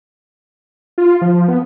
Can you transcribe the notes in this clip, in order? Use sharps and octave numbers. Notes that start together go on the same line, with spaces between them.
F4
F3
B3